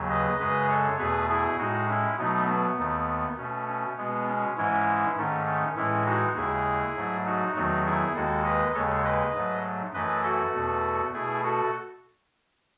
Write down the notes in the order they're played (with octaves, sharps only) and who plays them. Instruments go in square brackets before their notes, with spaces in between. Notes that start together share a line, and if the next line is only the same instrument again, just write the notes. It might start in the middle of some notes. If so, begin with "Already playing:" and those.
Already playing: [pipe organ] D#2 C#3 F#3
B4 D#5
F#2 C#3 G#3 B4 D#5
A4 C#5
E2 B2 A3 G#4 B4
E4 G#4
A2 G#3 D#4 F#4
C#4 E4
B2 F#3 A3 B3 D#4
B3
D#2 D#3 A3
B2 A3 C#4
C#4
B2 G#3 B3
C#4
G#2 E3 G#3 C#4 E4
G#2 D#3 A3 C#4
C#4
A2 E3 G#3 C#4 E4
D#4 F#4
D#2 C#3 G#3 E4 G#4
G#2 F#3 A3
D#4 F#4
E2 D#3 F#3 A3 D#4 F#4
E4 G#4
D#2 D#3 G#3 F#4 A4
B4 D#5
D#2 C#3 G#3 A4 C#5
B4 D#5
G#2 F#3 A3
F#2 E3 A3 B4 D#5
F#4 A4
E2 B2 A3
B2 A3 E4 G#4
F#4 A4